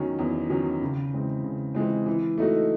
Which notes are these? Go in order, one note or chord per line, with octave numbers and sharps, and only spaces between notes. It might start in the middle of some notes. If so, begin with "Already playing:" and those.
Already playing: E2 D#3 F#3 C#4
E2
D#3 F#3 C#4
C#3
E3 G#3 C4
C#3
E3 G#3 C4
E3
A3 D#4 F#4